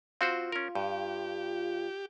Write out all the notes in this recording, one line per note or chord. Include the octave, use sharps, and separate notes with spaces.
C4 F4 F#4 C5
C#4 A#4
G2 G4